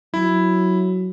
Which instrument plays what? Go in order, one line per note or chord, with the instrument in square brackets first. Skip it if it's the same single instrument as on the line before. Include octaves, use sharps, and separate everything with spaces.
[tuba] F#3 [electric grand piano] E4